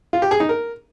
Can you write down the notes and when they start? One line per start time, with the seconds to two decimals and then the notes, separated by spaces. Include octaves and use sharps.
0.13 F4
0.22 G4
0.31 G#4
0.40 D#4
0.49 A#4